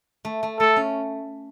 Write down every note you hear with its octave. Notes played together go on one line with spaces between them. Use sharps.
A3
A3
A3 A4
C#4